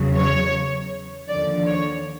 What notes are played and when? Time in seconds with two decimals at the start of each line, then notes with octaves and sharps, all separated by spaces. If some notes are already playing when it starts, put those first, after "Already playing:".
Already playing: E2 C#3 F#3
0.15 C#5
1.28 D#2 D3 F3 D5
1.66 C#5